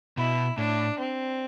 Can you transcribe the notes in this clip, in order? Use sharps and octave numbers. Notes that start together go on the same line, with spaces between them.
B2 E4
A2 D4
C4